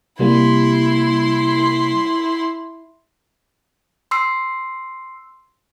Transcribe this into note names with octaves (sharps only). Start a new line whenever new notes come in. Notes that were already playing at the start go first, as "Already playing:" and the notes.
C3 G3 A#3 E4 C6
C6 E6 C7